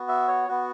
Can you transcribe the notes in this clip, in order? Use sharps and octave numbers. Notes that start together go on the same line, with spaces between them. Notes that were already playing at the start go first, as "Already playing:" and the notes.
Already playing: B3 F#4
E5
C#5
B3 F#4